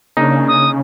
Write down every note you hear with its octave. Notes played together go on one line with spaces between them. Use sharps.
C#3 A#3 D4 D#4
D#6